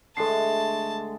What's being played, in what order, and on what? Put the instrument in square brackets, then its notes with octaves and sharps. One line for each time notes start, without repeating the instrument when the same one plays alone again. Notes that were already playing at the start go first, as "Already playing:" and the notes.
[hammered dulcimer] D3 G#3 A3 [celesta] A4 C7 [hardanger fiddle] A5